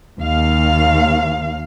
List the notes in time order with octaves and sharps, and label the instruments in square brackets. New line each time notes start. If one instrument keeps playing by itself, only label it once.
[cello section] D#2 F5